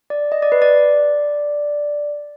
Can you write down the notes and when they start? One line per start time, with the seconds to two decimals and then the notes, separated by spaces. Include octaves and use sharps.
0.10 D5
0.32 D#5
0.42 D5
0.52 B4
0.62 D5